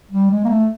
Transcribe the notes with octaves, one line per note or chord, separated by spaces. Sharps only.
G3
G#3
A#3
A3